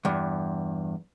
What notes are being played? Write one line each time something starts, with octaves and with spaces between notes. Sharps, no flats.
E2 G2